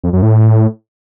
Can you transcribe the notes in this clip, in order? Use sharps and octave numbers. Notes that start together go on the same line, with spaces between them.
F2
F#2
A2